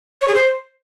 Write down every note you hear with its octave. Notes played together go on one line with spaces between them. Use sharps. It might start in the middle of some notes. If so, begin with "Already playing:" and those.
C#5
G#4
C5